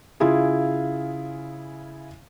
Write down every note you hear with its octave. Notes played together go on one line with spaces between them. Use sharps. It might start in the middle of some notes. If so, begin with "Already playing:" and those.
C#3 E4 F4 G#4